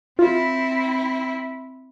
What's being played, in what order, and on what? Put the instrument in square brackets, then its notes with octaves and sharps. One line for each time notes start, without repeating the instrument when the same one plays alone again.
[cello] C4 E4 [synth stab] F4